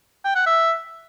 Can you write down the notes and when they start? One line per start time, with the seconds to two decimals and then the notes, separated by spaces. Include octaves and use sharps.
0.25 G5
0.35 F#5
0.46 E5